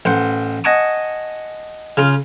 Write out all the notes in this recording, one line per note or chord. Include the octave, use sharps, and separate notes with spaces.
A1 C5 F#5
D#5 F#5 G#5 A5 C#6 D#6
C#3 F4